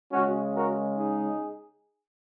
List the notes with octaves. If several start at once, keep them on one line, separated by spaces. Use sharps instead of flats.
C#3 G#3 C#4 F#4
F#4 A#4
D#4 G#4